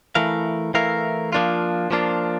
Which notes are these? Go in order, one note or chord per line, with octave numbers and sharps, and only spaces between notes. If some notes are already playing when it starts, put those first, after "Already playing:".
E3 A3 E4 A#4 F5
E3 A3 E4 A#4 F5
F3 A#3 D4 F4
F3 A#3 D4 F4